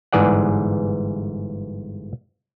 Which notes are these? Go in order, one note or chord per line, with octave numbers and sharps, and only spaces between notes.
G1 G#2 E3 G#4 D5 F#5